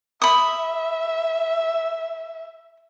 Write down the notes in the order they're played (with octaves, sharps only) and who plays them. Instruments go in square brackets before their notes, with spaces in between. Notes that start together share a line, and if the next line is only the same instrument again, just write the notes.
[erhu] E5 [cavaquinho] B5 D#6